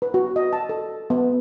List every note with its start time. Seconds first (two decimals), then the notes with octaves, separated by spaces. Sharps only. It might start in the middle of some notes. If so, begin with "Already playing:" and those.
0.02 B4
0.14 F#4
0.36 D#5
0.53 A5
0.69 A4
1.10 B3